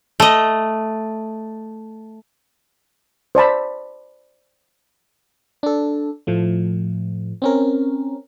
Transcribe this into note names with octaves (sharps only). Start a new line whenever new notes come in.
A3 D#5
C5 D5 A5 B5
D4 A4
A2 F3 A3
C4 C#4 A#4